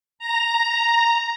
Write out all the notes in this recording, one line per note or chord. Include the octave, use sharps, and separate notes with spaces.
A#5